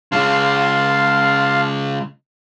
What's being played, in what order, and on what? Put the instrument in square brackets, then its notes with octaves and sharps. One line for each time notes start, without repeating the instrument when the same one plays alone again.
[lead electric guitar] C#3 G#3 [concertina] F5 A5 C6